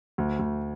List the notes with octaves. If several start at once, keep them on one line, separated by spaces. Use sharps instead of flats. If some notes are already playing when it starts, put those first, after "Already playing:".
D2
D2